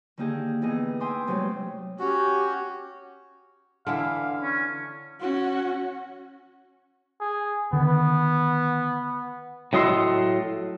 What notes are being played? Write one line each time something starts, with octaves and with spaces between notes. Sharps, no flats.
D3 D#3 A#3 D#4 G4 G#4
A2 E3 B3 D#4 G#4 D#5
E5 G5 G#5 C6 D6 D#6
G2 C3 F#3 G#3 A3
C#4 F#4 G4
D3 E3 E4 F5
C#4
C#4 F#4
G#4
D3 D#3 B3
A2 F#3 D#5 E5 C6